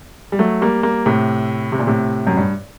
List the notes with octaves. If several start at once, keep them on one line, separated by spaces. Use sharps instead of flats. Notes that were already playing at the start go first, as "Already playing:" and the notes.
G3
F#3 A3
G3 A#3
G3 A#3
A2 C3
C3
A#2
A2 C3
F#2
G2